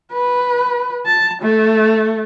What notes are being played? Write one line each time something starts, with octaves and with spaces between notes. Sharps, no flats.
B4
A5
A3